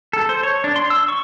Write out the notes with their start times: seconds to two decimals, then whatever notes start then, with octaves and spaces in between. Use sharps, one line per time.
0.13 A4
0.29 C5
0.43 C#5
0.64 D4
0.76 C6
0.90 E6
1.08 C#6